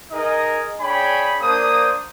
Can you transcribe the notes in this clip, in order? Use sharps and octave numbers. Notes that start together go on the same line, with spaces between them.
D#4 G#4 A#4 D#5
D4 G#4 C#5 G5 G#5 B5
A#3 D4 C5 D#6